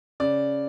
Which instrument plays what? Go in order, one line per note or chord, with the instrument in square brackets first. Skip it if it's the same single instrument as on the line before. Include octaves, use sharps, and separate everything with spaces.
[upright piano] C#3 D5